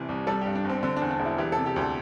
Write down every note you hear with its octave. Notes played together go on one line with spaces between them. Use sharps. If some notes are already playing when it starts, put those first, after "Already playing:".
Already playing: G1 C3 E3
C2
G3 A4
G2 G4
D4
G1 C4
D3 C4
D4
E2
D4
E1
E4
E3 G4
A4
C3
G4
D2 A4